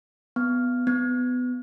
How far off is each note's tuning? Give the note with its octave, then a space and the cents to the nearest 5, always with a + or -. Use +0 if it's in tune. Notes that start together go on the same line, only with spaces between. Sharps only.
B3 +5
B3 +20